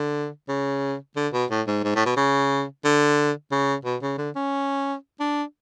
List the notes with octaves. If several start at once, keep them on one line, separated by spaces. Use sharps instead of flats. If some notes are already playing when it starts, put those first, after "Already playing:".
Already playing: D3
C#3
D3
B2
A2
G#2
G#2
A2
B2
C#3
D3
C#3
B2
C#3
D3
C#4
D4